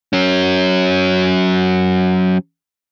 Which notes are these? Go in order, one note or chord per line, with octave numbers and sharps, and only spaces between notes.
F#3 C#4